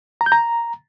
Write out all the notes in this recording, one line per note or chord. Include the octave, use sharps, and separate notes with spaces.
A#5
G6
A#5